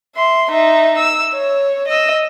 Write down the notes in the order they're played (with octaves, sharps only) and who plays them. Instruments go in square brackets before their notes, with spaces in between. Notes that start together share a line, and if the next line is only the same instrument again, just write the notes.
[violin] E5 C6
D#4 E5
E6
C#5
D#5 E6